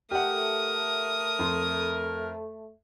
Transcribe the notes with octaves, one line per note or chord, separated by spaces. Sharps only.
A3 G4 A#4 F#5 D#6
F2 C6